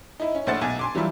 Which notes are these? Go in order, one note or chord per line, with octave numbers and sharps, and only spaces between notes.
D#4 E4
C#4
A#1 A2 C5 F#5 A6
B1 G#5 D6 G#6
G#5 C6 D6
E3 F#3 G3 E4 F4